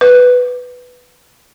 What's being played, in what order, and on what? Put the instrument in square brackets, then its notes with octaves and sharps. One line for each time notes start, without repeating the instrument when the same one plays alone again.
[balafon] B4